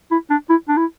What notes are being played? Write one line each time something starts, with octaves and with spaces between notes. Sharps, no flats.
E4
D4
E4
D4
E4